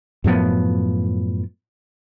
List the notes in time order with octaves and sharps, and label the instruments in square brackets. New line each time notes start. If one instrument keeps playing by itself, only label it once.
[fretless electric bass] F#2 A2 F3 B3